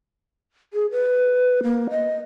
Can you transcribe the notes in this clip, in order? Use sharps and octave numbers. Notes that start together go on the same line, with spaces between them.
G#4
B4
A#3
D#5